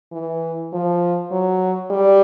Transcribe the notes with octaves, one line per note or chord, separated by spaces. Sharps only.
E3
F3
F#3
G3